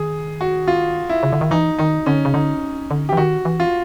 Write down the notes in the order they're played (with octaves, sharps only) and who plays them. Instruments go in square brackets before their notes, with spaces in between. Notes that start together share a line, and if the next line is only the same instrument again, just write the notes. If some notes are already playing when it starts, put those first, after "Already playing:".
Already playing: [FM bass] D#3 [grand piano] G#4
[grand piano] F#4
F4
E4
[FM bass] C#3
D3
D#3
[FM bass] E3 [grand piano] D#4
[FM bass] D#3 [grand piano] D#4
[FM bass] D3 [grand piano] C#4
[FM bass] C#3
[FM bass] D3 [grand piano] D#4
[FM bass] D3
[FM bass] E3 [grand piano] G4
[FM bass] D#3 [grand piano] F#4
[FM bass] E3
[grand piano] F4